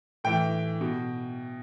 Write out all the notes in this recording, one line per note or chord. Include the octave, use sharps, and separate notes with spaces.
A2 E3 G5
B2